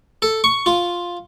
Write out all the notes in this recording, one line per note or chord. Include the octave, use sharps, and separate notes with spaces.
A4
C#6
F4